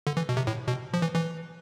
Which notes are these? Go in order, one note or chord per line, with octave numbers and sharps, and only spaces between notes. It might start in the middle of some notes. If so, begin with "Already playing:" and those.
D3
E3
B2
C3
A2
B2
F3
E3
E3